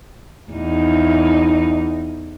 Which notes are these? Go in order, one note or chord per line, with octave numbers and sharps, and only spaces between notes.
E2 D#4